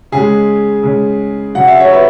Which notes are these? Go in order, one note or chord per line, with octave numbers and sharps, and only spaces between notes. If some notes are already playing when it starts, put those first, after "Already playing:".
C#3 G#3 G#4
C#3 G#3
C#3 F#3 F#5
E5
C#5
B4 E5